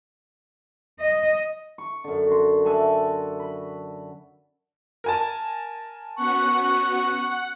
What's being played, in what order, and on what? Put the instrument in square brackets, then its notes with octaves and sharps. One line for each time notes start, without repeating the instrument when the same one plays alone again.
[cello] D#5
[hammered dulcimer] C#6
F#2 D3
F#4 C6
E5 F#5 G#5 A5
B5
[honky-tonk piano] A#4 G#5 A5
[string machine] B3 C#4 F#4 [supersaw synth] F#5 [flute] C#6